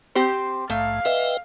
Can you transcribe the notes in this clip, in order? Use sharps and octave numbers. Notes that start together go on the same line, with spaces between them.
C4 G4 C5
A#1 G#2 A3 F5
B4 D#5 E5 G5